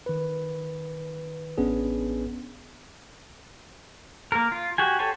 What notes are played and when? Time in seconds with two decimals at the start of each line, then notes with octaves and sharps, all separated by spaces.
0.06 D#3 B4
1.58 A1 B3 C#4 D4 G#4
4.32 A#3 A#4
4.52 F4
4.78 F#4 G4 G#5
4.99 G4 A4 C5 C#5 G#5